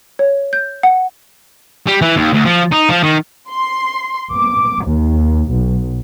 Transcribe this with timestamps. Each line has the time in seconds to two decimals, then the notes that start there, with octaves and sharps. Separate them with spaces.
0.19 C#5
0.53 G6
0.83 F#5
1.87 G3
2.02 E3
2.17 D#2
2.34 D2
2.46 F3
2.72 D#4
2.89 F3
3.03 D#3
3.51 C6
4.35 D6
4.87 D#2
5.50 B1